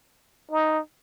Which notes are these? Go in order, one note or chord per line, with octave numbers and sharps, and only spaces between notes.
D#4